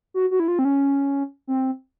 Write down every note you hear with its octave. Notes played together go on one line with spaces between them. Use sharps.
F#4
F#4
E4
F4
C4
C#4
C4